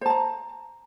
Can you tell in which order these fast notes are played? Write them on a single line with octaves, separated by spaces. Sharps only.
C5 A5 A#5